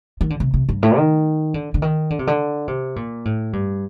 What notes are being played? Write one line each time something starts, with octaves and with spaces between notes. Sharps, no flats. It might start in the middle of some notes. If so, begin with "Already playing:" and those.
D#3
D3
C3
C3
G2
A2
D#3
D3
D3
D#3
D3
C3
D3
C3
A#2
A2
G2